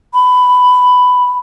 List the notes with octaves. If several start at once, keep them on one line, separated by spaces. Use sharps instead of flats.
B5